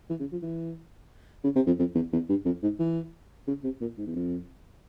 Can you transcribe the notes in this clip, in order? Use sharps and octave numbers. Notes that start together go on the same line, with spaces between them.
E3
C#3
F3
E3
C#3
C3
F2
F2
E2
E2
G2
F2
G#2
E3
C#3
C3
A#2
G#2
E2
F2